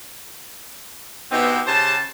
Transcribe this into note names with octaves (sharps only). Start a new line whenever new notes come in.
B2 B3 C4 D#4 E4 G4
C#3 G4 C5 A5